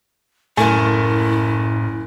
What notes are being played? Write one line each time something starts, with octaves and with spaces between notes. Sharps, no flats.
F#1 A2 A3 E4 A#4 G#5